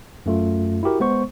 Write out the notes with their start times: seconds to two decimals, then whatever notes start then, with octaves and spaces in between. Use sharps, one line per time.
0.26 F#2 A3 F4
0.83 E4 F#4 G4 A#4
1.00 G#3 B3 C5 C#6